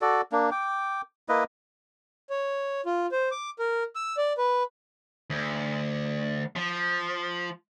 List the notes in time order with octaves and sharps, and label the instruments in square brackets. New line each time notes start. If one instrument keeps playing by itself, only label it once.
[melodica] F#4 A4 D5
A#3 D4
G5 D6
A#3 E4 B4 D#5
[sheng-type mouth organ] C#5
F4
C5
D6
A#4
E6
D5
B4
[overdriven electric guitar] D2
F3